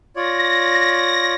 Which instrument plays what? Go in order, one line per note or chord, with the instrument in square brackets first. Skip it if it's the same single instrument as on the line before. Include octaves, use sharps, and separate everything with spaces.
[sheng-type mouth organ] F4 C#5 D5 [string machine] A#6